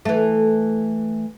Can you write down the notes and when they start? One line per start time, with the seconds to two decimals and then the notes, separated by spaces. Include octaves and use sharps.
0.05 E3 A3